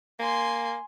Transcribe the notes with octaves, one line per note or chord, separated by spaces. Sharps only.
A#3 G#5 C6